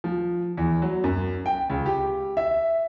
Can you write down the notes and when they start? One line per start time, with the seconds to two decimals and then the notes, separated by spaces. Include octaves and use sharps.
0.04 F3
0.57 E2
0.82 F#3
1.04 F#2
1.46 G5
1.70 C#2
1.86 G4
2.37 E5